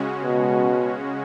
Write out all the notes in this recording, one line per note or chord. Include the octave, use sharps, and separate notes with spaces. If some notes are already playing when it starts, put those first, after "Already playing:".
Already playing: C#3 G#3 C#4 F#4
B2